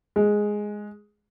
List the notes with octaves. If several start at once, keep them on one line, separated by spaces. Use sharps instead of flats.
G#3